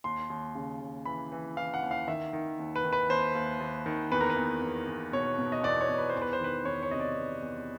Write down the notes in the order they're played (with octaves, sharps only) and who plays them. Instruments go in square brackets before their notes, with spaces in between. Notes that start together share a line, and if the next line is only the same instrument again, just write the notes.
[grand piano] D#2 C6
D#2
C#3
D#2
E3 B5
E3
E3 F5
F#5
D#2
F5
D#3 E5
D#3
D#2
B4
D#3
B4
D#2 C5
D#2
D#2
D#3
E2 B4
A#4
B4
E2
E2
E2
B2 C#5
B2
D#5
E2 D5
C#5
E2
B4
C5
E2
B4
C5
D#3 B4
E2 C#5
C#5
C3 D#5
D5
E2
E2